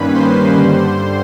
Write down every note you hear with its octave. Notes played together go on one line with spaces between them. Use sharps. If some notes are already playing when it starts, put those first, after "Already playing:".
Already playing: G2 D#3 G3 A#3 C#4 B4 B5
C5 C6
G2 D3 G3